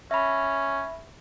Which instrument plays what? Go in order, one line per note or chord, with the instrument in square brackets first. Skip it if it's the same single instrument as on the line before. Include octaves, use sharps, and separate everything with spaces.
[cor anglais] C#4 [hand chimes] E5 B5